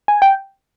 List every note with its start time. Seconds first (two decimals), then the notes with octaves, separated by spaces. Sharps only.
0.08 G#5
0.22 G5